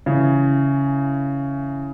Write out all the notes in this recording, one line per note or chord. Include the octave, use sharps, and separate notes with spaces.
C#3 E3